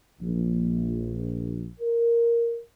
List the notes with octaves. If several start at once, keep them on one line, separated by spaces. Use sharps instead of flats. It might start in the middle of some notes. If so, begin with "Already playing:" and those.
A#1
A#4